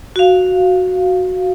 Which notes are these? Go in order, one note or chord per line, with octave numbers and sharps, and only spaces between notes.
F#4 F5